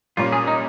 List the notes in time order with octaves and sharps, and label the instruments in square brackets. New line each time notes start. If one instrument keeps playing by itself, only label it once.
[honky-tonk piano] A#2 G3 C#4 [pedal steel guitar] F4
[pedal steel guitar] G#4
D#4